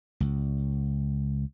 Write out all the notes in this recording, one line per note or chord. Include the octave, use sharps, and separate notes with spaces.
C#2